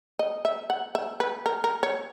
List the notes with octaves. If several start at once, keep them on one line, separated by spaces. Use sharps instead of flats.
D#5
E5
F#5
E5
B4
A#4
A#4
C#5